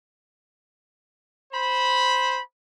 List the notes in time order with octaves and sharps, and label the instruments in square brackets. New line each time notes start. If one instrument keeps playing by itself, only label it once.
[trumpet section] C5 B5